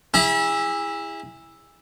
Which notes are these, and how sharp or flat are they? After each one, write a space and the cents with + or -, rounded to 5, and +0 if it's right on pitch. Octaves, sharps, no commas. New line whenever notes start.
E4 +0 G#4 -30 B5 -35